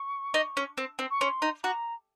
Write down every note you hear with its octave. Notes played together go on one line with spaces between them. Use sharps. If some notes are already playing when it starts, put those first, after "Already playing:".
Already playing: C#6
D#4
C#4
C4
C4
C#6
C#4 C6
D#4
F#4 A#5